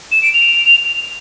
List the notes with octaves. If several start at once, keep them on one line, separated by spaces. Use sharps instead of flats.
E7
D7
F7